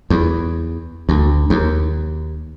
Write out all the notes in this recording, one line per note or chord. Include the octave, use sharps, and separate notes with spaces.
E2
D2
D#2